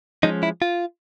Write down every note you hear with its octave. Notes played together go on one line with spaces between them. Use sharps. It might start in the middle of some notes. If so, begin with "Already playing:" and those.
F3 G#3 C#4 D#4
E4
F4